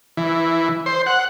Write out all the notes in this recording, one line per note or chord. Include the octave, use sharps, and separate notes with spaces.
E3
C5
F#5